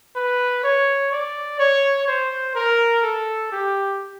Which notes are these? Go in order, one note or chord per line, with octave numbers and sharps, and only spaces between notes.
B4
C#5
D5
C#5
C5
A#4
A4
G4